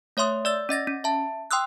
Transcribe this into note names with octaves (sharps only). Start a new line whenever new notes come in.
A3 C#5 E5 C6 D#6
D5 E6 A6
C#4 D#5 A6 A#6
C#4
E5 A5
G5 C6 D#6 E6 F#6